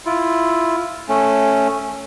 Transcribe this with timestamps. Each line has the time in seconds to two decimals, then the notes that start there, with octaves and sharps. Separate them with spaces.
0.06 E4 F4
1.09 A3 C#4